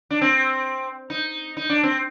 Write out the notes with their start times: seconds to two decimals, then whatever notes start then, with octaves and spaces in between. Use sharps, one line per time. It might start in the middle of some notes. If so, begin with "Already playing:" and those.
0.10 D4
0.21 C4
1.10 D#4
1.57 D#4
1.69 D4
1.83 C4